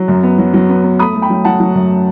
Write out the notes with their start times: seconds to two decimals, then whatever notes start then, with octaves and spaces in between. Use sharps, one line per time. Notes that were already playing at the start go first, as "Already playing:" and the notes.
Already playing: F#3
0.08 F#2
0.23 B3
0.38 F#3
0.54 F#3
0.69 B3
0.84 B3
0.99 A3 B5 D#6
1.15 A3
1.22 G5 B5
1.30 F#3
1.44 F#3 F#5 A5
1.60 F#3
1.75 F#2